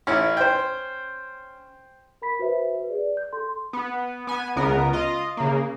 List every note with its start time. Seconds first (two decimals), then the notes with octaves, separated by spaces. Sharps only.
0.07 A1 C#4 E4
0.37 C5 G5
2.22 A#4 B5 B6
2.39 F#4 B4 C5 E5
2.75 B4
2.89 G#4 D5
3.17 G6
3.33 A4 C6
3.73 B3
4.27 B3 G#5
4.56 C#2 C#3 B3 A#4
4.93 F4 D#5
5.37 C#3 A#3